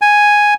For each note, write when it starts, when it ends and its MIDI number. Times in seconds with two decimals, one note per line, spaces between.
0.01 0.54 80